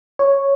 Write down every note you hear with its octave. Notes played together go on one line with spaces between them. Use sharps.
C#5